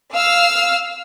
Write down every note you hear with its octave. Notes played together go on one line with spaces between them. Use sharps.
F5 E6 F6